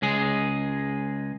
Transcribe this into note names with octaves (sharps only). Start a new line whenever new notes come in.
C#2 G#3 G#4